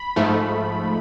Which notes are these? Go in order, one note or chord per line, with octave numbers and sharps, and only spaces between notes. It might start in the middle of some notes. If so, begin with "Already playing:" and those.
Already playing: B5
G#2 F3 A3